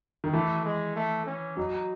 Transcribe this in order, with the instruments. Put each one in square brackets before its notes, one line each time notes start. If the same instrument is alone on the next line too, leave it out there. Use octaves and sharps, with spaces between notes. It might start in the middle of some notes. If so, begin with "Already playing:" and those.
[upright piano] D#3
[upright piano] E3 [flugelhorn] A3
[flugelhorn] G#3
A3
C#4
[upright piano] F#3 [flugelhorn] D#4